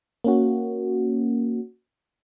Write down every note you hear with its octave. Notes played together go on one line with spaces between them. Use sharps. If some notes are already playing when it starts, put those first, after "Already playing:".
A#3 C#4 F#4